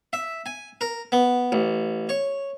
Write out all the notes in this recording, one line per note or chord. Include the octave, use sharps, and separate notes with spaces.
E5
G#5
A#4
B3
A1
C#5